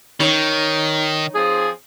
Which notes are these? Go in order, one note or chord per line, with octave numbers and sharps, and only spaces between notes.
D#3 D#4 C#5
F3 C4 G#4